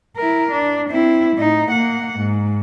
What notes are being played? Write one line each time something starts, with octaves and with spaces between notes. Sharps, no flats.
E4 A#4
D4
C4 E4
A2 D#4
A#3 F#5
G#2